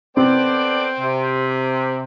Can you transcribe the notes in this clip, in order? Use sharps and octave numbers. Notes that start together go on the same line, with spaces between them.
B3 C4 A4 C5 D5 G5
C3